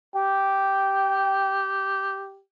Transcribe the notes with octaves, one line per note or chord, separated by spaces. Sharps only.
G4 G5